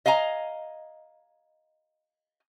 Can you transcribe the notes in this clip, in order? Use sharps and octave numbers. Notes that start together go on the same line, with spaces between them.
D#5 F5 G#5 A#5